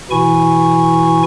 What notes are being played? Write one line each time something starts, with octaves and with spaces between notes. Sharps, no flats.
B2 E3 E4 G#5 C#6